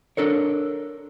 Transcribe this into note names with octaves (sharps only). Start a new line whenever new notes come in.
D4 A4 A#4 C#5